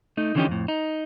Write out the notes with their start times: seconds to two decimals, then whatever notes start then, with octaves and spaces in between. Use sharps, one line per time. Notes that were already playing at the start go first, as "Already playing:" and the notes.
0.17 A3 D#4
0.35 D3 E3 F3 C#4 D#4 G4
0.48 F2 A2
0.68 D#4